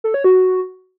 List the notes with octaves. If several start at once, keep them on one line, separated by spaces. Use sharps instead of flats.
A4
C#5
F#4